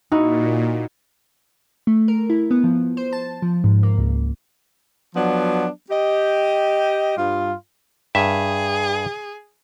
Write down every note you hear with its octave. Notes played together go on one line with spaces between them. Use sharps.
A#2 D#4 E4 F#4
A3
A#4
E4
B3
F3
C5
A5
F3
G#2
A#3
C#2
F3 F#3 B3 D4
G4 D#5
G2 F4
G2 G#4 E5